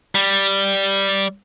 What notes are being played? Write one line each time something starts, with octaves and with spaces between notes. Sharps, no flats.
G3